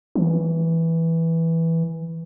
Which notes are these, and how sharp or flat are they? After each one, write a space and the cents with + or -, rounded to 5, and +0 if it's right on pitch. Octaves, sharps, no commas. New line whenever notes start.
E3 -5